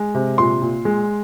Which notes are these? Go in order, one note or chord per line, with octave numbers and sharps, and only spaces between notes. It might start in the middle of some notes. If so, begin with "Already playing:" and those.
Already playing: G#3
C3
A#2 C6
A#2
G#3